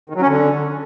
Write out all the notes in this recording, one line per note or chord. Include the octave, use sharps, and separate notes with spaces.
D#3
F#3
C#4
D3